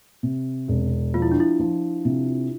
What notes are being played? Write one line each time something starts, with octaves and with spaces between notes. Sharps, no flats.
C3
E1
F3 F4
E4
D4
E4
F3
C3